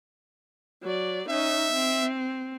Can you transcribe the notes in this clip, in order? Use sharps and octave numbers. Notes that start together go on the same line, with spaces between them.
F#3 D5
C#4 D#4 E5
C4